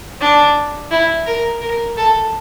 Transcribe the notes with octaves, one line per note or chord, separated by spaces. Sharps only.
D4
E4
A#4
A#4
A4